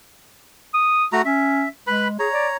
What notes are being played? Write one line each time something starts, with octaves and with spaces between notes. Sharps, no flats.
D#6
A3 F#4 A#5
C#4 E5
G#3 B4 B5
G#4 C#5 A#5
D5